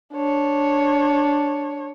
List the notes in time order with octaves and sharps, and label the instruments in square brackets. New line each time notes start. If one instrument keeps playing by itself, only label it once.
[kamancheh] D4 C#5